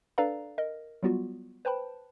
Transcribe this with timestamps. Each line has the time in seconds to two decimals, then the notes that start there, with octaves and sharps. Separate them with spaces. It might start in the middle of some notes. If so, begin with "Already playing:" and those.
0.18 D4 A4 B4 D5 F5 A#5
0.58 A#4 D#5
1.03 F#3 G3 B3 F4 F#4
1.65 B4 C5 G5 A5 B5